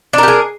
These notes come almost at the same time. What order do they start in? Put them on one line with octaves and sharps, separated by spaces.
D4 A#4 G4 G#4